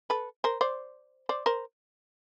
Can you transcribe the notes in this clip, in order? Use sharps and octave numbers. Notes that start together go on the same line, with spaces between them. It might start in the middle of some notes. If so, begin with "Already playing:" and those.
A4 B4
A#4 C5
C5 D5
C5 D5
A#4 C5